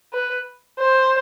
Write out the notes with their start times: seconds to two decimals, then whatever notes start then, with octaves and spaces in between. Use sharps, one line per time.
0.13 B4
0.79 C5